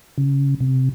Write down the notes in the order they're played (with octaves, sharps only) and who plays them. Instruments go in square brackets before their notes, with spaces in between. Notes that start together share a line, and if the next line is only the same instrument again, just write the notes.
[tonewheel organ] C#3
C3